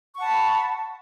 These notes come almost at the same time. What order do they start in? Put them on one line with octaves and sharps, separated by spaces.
C#6 F#5 A5 B5